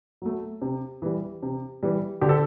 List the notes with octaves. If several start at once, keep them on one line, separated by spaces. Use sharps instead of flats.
F#3 A3
C3
E3 G3
C3
E3 G3
D3 G4
A4